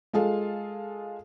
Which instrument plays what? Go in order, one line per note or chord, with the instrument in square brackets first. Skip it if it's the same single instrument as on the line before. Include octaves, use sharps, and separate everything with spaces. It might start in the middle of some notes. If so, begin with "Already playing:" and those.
[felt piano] G#3 F4 G#4 A4 F5